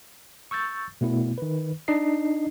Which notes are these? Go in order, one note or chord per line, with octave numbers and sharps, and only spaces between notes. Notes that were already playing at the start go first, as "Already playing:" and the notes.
C#6 E6 G6 A6
B2 A3 B3 E4
D#3 B4
D4 D#4 D#5 C7